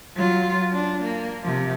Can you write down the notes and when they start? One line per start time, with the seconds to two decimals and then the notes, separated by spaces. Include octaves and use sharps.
0.15 F#3 F4
0.73 D4
1.04 A#3
1.43 C3 F3